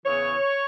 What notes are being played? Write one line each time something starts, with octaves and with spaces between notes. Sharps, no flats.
E2 C#3 E3 C#5